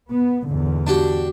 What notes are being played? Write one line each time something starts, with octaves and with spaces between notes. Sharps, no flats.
B3
E2 G#2 D3
D4 F#4 G4